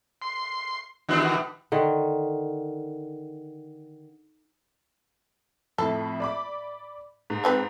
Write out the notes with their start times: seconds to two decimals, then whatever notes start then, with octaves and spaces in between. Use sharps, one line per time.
0.22 C6
1.09 D#3 E3 G3 B3 D4 F#4
1.72 D3 D#3
5.78 F2 A2 A4
6.20 D5 B5 D6
7.30 G#2
7.44 F3 C4 B4